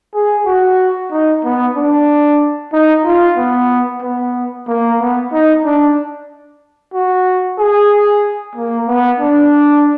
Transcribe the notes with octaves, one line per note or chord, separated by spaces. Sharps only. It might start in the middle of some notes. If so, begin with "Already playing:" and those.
G#4
F#4
D#4
B3
D4
D#4
F4
B3
B3
A#3
B3
D#4
D4
F#4
G#4
A#3
B3
D4